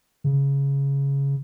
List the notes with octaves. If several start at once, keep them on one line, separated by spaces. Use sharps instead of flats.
C#3